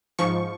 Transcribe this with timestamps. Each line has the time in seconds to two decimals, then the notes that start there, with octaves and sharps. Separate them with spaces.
0.19 G#2 F3 C#6